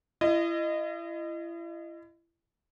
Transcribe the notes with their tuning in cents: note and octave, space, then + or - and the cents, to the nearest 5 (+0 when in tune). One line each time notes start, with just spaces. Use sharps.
E4 +35 D#5 -15